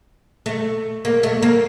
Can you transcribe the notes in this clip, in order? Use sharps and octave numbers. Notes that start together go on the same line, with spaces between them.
A3
A#3
A3
A#3